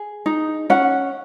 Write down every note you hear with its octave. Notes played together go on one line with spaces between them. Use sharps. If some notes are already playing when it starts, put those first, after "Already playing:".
Already playing: G#4
D#4
C#4 F#5